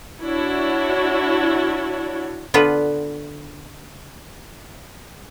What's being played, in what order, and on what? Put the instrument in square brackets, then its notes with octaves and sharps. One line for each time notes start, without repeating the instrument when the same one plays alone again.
[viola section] D4 E4 F#4 C#5
[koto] D3 B3 F4 B4